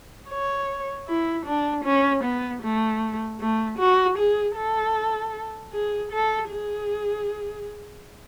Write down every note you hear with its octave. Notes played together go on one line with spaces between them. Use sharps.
C#5
E4
D4
C#4
B3
A3
A3
F#4
G#4
A4
G#4
A4
G#4